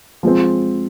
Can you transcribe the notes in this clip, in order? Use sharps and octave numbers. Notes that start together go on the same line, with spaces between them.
F3 G#3 C4